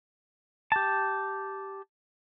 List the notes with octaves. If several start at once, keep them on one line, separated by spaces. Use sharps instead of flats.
G4 A5